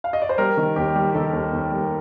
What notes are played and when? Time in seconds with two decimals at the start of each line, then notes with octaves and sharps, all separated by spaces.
0.04 F5
0.13 D#5
0.22 D5
0.29 C5
0.38 G3 A#4
0.57 D#3
0.76 D#2 G4
0.95 G3
1.10 G4
1.15 D#3 A4
1.33 D#2
1.53 D#2
1.72 G3